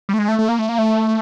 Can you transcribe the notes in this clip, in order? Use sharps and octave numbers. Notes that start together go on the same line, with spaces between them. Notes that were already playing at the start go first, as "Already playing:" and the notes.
G3
A3
G#3
A3
A3
A#3
A3
A#3
A3